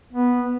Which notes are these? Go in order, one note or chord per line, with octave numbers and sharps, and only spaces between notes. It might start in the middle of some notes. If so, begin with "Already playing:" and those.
B3